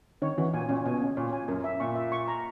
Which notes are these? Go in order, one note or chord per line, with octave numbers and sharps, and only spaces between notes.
D#3 C#5
E3 F#4
A#2 G#5
A#2 C#4
B2 G#5
C#4
A#2 C#5
G#5
F#2 A#4
E5
A#2 C#6
E5
C#6
A#5